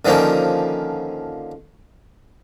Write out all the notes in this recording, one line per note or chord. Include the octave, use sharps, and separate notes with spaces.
D3 D#3 F3 A#3 C#4